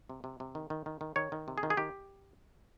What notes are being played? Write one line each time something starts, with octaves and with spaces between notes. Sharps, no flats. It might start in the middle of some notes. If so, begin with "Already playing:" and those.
C3
C3
C3
D#3
D#3
D#3
D#3
D#3 C#5
D#3
C3
G#4
D#3
G#4
D#3 G4